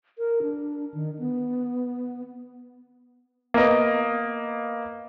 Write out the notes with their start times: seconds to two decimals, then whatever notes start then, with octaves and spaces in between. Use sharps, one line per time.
0.18 A#4
0.42 D4
0.94 D#3
1.19 B3
3.54 A#3 B3 D#5